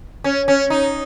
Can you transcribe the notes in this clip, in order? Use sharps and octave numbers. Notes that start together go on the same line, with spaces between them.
C#4
C#4
D#4